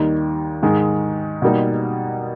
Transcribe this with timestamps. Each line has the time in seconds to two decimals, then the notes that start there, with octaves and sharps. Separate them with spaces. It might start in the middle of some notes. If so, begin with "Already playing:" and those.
Already playing: D#2 D#3 G3 A#3 D#4
0.62 G#2 D#3 G#3
1.42 B2 G3 A#3 D#4